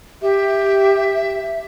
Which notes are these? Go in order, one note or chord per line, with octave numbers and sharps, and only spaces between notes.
G4 E5